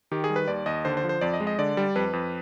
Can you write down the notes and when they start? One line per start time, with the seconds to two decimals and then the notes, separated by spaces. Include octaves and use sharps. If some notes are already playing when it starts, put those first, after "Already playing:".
0.11 D#3 G4
0.24 G#4
0.30 G3
0.36 B4
0.48 D#2 D5
0.66 D#2 D#5
0.85 D3 C5
0.97 C5
1.04 F3
1.09 C5
1.21 F2 D5
1.33 D#5
1.40 G#3
1.47 D#5
1.58 D3 D5
1.77 G3
1.96 F2 B4
2.13 F2